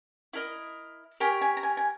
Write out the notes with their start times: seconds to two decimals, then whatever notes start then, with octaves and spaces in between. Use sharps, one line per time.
0.33 E4 A#4 D#5
1.20 G4 A#4 C#5 G#5
1.41 G#5
1.57 A#5
1.63 G#5
1.77 G#5